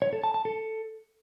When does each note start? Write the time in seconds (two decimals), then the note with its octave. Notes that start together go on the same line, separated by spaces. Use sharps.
0.02 C#5
0.13 A4
0.24 A5
0.34 A5
0.45 A4